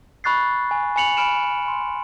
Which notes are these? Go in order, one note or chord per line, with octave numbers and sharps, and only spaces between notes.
B5 C#6 F#6 A6 C7
G#5
G#5 B5 C#7 F7 F#7
G#5 B5 F6 D7 E7
C6